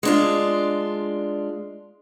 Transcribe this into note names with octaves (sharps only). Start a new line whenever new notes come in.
G#3 D4 F4